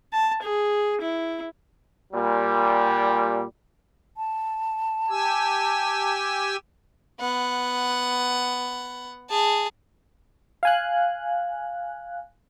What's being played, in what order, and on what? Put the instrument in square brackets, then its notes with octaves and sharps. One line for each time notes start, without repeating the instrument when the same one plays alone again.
[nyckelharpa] A5
G#4
E4
[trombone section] A#2 G3
[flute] A5
[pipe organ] G4 G#5 E6
[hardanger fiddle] B3 F#5
G#4 A5
[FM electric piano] F5 G#5 F#6